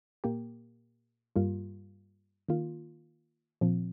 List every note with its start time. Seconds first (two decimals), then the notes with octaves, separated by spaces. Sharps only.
0.24 A#2 A#3 G4
1.36 G2 G3 A#3 F4
2.49 D#3 A#3 F4
3.61 A#2 F3 C4